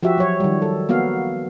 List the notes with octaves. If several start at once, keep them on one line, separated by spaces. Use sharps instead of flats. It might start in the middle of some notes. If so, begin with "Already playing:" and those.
F3 F#4 G4 E5
F#3 C#5
D#3 G3
A4
A#3 B3 F#4 F5